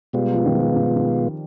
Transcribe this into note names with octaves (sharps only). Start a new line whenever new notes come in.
B2 G3 G#3 B3 F4
F3
D#3
F3
D#3
D#3